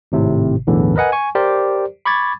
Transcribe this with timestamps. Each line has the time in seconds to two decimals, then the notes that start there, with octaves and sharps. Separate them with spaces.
0.12 G#1 A2 C3
0.67 B1 E2 A2 D3 E3
0.96 A#4 B4 D#5 F#5 G#5
1.12 G#5 C#6
1.35 G4 A#4 C5 D5
2.05 B5 C#6 D6 G#6 A6